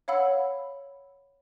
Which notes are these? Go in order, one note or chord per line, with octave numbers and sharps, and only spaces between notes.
C#5 F5 F#5 B5 E6